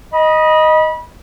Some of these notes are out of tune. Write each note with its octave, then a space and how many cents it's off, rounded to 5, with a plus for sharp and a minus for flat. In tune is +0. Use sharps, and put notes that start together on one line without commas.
D#5 +0 B5 -30